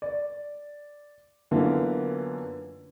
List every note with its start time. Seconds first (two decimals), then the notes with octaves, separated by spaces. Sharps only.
0.02 D5
1.51 F#2 D3 E3 A#3 B3 F4